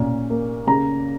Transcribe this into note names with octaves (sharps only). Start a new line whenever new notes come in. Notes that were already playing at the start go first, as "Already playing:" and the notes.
Already playing: A#2 C#4
A#3
C#3 A#5